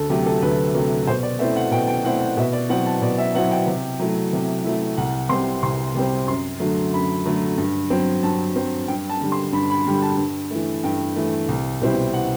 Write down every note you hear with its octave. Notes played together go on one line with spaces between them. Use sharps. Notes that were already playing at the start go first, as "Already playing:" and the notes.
Already playing: D2 A4
C3 F#3 A3 G4
A4
D2 B4
C3 F#3 A3
B2 C5
D5
A3 C4 E4 E5
F#5
B2 G5
G5
A3 C4 E4 F#5
F#5
B2 E5
D5
F#3 C4 E4 F#5
A5
B2 D5
E5
F#3 C4 E4 F#5
G5
C3
F#3 A3 E4
C3
F#3 A3 E4
C2 F#5
C3 G3 C4 C6
C2 C6
C3 G3 C4
F#2 C6
D3 F#3 A3
F#2 B5
D3 F#3 A3
G2
F#3 C4
G2 A5
F#3 C4
G2 G5
A5
D3 G3
C6
G2 B5
B5
D3 G3
A5
G2
E3 A3
G2 G5
E3 A3
C2
B2 G3 C4 E4
F#5